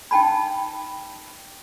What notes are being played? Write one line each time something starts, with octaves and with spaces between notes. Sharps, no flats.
D#4 G5 A5 B5